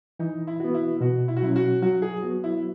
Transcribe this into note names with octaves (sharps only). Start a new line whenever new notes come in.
E3 D#4
E4
B3 F#4
E4
B2 F#4
E4
F#4
F#3 C#4 E4
F#4
F#3 F#4
G#4
B3 F#4
E4